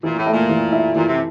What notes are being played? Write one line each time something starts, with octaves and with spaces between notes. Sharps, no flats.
A#2 E3
A2
A3
A#2
E3
E4
A#2 E3
C3